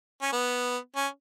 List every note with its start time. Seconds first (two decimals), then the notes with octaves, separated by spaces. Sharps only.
0.22 C#4
0.32 B3
0.96 C#4